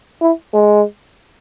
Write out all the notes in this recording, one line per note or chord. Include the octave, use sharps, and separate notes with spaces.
E4
G#3